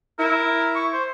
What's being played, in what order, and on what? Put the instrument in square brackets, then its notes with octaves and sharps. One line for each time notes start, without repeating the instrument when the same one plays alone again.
[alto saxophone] E4 [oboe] A#4
[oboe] C#6
C5